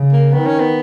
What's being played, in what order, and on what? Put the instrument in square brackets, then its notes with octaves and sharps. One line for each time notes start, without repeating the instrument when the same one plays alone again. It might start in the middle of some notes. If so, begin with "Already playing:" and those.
Already playing: [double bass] C#3
[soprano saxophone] A#3
[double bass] D#3 [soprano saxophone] B3
[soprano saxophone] C#4
B3